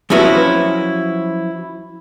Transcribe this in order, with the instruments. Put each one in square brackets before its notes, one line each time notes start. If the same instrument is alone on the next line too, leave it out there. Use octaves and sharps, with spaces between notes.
[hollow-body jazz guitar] F3 F#3 C#4 E4 F#4 B4